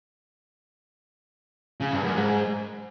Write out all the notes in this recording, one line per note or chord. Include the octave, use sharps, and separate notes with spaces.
C#3
G2
F#2
G#2